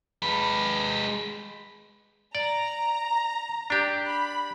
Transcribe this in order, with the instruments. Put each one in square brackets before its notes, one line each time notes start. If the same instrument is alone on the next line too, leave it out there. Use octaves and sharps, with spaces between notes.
[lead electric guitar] G#3 B4
[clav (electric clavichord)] D5 [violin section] A#5
[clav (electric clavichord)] D4 G4
[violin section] B5